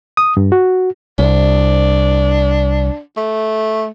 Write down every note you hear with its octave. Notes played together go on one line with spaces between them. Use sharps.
D#6
G2
F#4
C2 D4
A3